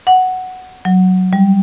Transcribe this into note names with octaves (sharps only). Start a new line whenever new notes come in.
F#5
F#3
G3